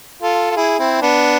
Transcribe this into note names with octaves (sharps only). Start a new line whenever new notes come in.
F4 A4
F4
E4 G#4
C4 E4
B3 D4